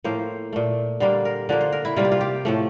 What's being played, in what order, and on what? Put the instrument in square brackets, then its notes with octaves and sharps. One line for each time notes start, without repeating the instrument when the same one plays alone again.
[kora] A2 F3 A#3 C5
A#2 A3
D3 G3 A#3 C5
A#4
D3 F3 A#3
C5
A#4
E4
C3 G3 A#3 F4
G4
F4
G4
A2 F3 A3